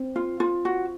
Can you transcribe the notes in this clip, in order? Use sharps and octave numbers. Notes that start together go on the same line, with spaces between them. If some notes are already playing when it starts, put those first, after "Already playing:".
Already playing: C4
F4
F4
F#4